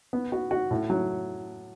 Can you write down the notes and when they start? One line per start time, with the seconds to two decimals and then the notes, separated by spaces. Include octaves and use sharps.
0.13 B3
0.32 F#4
0.51 F#4
0.71 A2
0.90 F#3